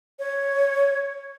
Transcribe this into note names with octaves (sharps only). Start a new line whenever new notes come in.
C#5